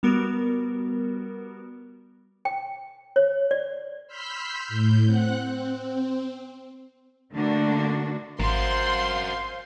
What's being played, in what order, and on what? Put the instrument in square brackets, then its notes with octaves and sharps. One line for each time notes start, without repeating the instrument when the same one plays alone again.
[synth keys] G3 B3 F#4 A#4
[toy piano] G5
C#5
D5
[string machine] B5 C6 E6 F6 G6 B6
A2 G6
C4 F#5 F#6
C4
[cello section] D3 A3 A#3 D4 F#4
[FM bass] G#1 [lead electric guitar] F#4 A#4 [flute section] C5 F5 [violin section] C6